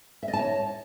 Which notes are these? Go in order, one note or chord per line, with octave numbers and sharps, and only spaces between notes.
E5
D#5
A5
C#5